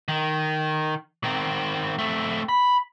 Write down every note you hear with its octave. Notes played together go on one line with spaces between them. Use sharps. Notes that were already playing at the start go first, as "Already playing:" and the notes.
D#3
D#3 C4
A3 C4
B5